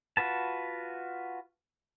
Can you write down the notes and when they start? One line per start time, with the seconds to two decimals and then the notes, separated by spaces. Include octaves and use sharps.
0.17 F4 F#4 B4 A5